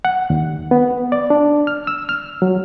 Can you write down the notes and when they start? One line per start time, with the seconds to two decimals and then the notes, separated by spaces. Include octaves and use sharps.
0.05 F#5
0.30 D#2
0.71 B3
1.12 D5
1.30 D4
1.67 F6
1.87 E6
2.09 F6
2.42 F#3